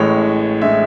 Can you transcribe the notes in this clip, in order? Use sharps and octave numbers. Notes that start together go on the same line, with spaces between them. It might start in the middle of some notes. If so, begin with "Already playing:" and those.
Already playing: A1 A2 G#3 C#5
A2 G#3 E5